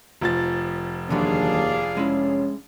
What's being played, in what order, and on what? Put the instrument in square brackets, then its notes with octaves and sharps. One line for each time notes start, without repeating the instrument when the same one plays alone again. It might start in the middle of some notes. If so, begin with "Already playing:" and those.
[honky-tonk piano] F1 F3 A6
[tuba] D#2 [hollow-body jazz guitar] D3 E3 F#3 [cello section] D4 G#4 F5
[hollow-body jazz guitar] G#3 E4 [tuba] C#4